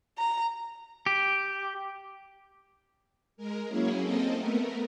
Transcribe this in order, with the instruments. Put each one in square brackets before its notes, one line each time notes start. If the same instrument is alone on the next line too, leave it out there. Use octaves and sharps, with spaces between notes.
[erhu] A#5
[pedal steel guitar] G4
[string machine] G#3 A#4
F#3 A#3 C#4 E4 G#4
A#3 C4 A4 D#5
A3 B3 A#4